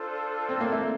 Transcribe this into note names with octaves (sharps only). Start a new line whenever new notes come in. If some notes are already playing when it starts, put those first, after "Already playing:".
Already playing: D4 F4 A4 C5
C4
A#3
A3